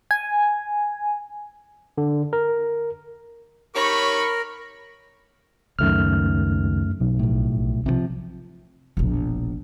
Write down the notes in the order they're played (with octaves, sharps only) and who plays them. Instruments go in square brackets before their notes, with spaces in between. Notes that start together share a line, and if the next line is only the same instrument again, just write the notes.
[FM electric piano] G#5
[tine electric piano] D3
A#4
[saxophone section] D#4 G4 C#5 [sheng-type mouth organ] A#4 [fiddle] B5 [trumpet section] C#6
[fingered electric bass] C#2 D#3 [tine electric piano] F#2 A3 F6
[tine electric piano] B1
[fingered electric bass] A#1 A2
C3 D#3 F3
[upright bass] E1 A#1